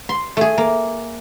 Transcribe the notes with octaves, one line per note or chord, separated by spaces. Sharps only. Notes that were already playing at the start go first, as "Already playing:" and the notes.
C6
A3 G#4
A#3